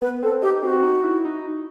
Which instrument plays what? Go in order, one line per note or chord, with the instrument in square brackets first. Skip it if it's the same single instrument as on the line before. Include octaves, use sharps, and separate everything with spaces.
[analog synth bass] B3 [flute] B4
[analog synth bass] C4 [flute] A4
[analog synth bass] D#4 [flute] G4
[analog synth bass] C4 [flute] F#4
[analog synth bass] D#4
E4
D#4